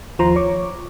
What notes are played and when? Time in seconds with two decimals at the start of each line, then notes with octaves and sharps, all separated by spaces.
0.19 D#2 F3 C5 A#5 C6
0.36 C#5 C#6 D6